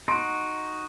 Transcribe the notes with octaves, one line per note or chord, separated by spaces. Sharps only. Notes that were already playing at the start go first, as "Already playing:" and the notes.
D#4 F#4 C6 D7